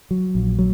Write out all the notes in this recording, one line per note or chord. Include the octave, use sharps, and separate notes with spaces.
F#3
A#1
F#3